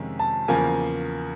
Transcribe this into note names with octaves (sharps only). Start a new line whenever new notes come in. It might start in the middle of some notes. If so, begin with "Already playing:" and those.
Already playing: F2 C3 D#3 G#3 C#4
A5
E2 C#3 F3 A#3 G#5